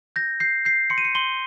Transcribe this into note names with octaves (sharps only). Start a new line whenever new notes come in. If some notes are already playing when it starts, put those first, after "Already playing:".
G6 A#6
G6 C7
G6 C7
C6 C#7
D#7
C#7
C6 G7